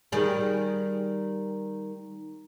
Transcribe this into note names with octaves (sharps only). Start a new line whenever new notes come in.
D#3 G3 G#4